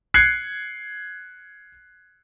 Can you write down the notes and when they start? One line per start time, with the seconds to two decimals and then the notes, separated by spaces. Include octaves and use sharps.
0.14 F#6 G#6 C7 C#7